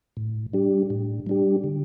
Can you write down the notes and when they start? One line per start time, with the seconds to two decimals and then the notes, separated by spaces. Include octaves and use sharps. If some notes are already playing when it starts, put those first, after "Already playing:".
0.17 A2
0.53 G3 D4 G4
0.90 A2
1.27 G3 D4 G4
1.64 D3